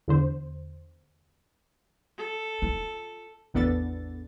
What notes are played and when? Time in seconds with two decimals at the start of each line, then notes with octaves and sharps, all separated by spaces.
0.08 E2 D3 C5
2.18 A4
2.62 F4
3.54 A1 E2 B3 D4 A4 A6